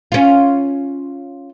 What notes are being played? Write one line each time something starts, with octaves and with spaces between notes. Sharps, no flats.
C#4 F4